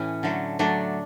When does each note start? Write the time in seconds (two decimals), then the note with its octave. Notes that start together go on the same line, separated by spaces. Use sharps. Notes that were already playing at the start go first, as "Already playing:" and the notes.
Already playing: A2 E3 C#4
0.23 D3 F#3 A3
0.59 D3 F#3 A3 D4